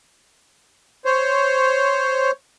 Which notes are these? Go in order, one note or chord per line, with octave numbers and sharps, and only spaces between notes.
C5 C#5